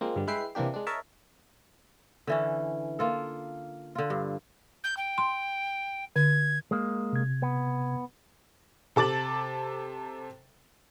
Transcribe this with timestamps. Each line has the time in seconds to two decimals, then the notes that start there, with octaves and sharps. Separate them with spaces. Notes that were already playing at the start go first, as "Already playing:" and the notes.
0.01 F3 G#3 A#3 C4
0.16 G2 D3 G3
0.27 G#3 E4 B4 E5 G5 C7
0.55 C3 E3 A#3 D4 G4
0.74 G#3 D4
0.87 A#4 C#5 D#5 E5 A5
2.27 D3 E3 C#4
2.99 A#3 F4 A4
3.95 D3 F4
4.10 G2
4.84 G6
4.97 G5
5.18 C6
6.16 D3 G#6
6.71 G#3 A#3
7.13 C3 G#6
7.42 B3
8.96 C3 A4 D6 A6 F#7